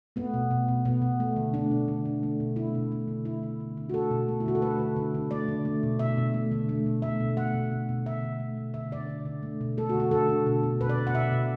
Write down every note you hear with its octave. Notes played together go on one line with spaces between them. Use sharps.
A3 B3
B2
B2
B2
B2 B3
B2
A3
D3
A3 D4
B2
D3
D3
A3
B2
A3 E4
B2
A3
D3
A3 E4
D3
D3
D3
F#4
A3 A4
B2
A3
E4
D3 F#4
A4
A3 B4
D3
D3
D3
A3 D5
D3
A3
B2
B2 E5
B2
A3
D3
A3
B2
A3 E5
B2
A3 F#5
B2
B2
B2
D3 E5
D3
A3
B2
D3 E5
D3 D5
D3
D3
A3
B2
A3 A4
F#4
D3
F#4
D3 A4
D3
B2
B2
B2 B4
D5
B2
F#5
B2 E5
B2